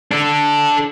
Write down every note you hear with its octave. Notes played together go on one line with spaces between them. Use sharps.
D4 A4